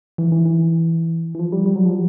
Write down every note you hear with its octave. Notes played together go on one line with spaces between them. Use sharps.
E3
E3
E3
E3
F3
G3
G3
F#3
F3